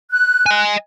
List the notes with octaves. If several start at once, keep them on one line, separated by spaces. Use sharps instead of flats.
F#6
D#5 G#5